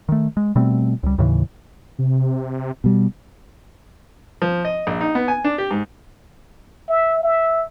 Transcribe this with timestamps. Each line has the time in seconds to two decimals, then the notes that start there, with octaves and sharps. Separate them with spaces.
0.09 D#3 A3
0.37 G#3
0.56 B2 G3 A3 C4
1.03 C#2 G3
1.18 D#2 A2 C#3 E3
1.99 C3
2.84 B2 G3
4.42 F3
4.65 D#5
4.87 A#1
5.01 D#4
5.15 B3
5.28 G#5
5.44 D4
5.58 G4
5.71 G#2
6.89 E5
7.23 E5